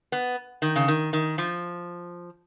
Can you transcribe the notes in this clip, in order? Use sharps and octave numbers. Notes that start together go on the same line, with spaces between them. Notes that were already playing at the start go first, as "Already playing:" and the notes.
B3
D#3
C#3
D#3
D#3
F3